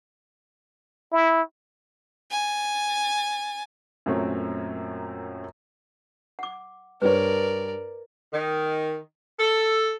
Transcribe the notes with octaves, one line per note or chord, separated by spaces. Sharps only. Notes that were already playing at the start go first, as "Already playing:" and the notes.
E4
G#5 A6
F#2 A#2 F#3 A3 C4 C#4
F#5 D6
G2 D4 A#4 B4 C#5 D5
D#3
A4